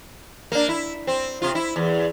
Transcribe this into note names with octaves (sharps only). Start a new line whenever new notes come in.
A#3 D4
E4
C4
C3 F4
E4
E2